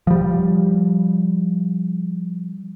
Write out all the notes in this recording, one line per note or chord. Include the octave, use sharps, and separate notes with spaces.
F3 G3